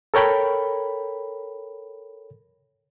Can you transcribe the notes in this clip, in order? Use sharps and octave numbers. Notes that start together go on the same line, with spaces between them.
A4 A#4 C#5 G5 B5